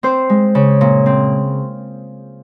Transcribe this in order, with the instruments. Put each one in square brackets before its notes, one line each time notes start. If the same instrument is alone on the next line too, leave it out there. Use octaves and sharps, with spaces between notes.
[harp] C4 C5
G#3
C#3
A#2
C4